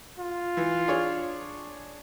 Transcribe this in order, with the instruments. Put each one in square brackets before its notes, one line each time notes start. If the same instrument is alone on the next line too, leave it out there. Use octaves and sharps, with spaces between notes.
[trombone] F4
[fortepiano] E3
D4 G#4 C#5